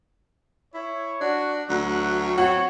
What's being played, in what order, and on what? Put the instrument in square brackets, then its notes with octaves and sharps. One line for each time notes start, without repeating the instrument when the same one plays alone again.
[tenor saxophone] E4 [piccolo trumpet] C#5
[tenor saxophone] D4 [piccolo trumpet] F#4
[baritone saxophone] D2 [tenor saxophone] F#3 [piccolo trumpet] F#6
[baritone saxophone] C4 [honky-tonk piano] F#4 [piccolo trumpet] C#5